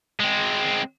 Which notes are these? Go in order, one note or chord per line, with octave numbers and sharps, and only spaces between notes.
G#3 C4